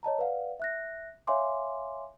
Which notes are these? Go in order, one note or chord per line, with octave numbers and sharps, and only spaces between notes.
C#5 D#5 A5 A#5
B4 D5 F5 F#5
E5 F#6 A#6
C#5 E5 F5 G#5 C6 D6